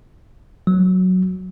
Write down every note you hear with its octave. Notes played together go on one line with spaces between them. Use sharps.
F#3